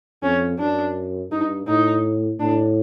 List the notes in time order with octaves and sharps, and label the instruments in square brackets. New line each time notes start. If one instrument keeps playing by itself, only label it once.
[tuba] F2 [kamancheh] C#4
[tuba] F#2 [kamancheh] D4
[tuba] G2 [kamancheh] D#4
[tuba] A2 [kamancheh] D#4
[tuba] A2 [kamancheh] D4